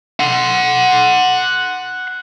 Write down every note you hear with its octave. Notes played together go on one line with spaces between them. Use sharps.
F#5 C6